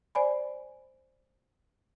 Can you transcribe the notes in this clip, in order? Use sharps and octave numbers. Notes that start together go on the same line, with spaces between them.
C5 D5 G#5 B5